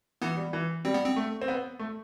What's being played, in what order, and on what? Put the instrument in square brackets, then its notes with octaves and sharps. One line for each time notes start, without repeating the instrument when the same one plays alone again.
[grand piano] E3 [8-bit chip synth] B3
[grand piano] G3
E3
[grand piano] G3 [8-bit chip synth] C4
[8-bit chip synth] B3
C4
[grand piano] A3
C4
B3
A3